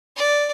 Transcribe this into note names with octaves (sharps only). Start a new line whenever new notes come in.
D5